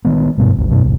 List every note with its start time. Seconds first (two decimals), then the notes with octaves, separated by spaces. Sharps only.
0.05 D#3 G#3 B3
0.38 F#1 G2 B2
0.57 G#1 D2
0.70 F#2 B2
0.83 E1 C2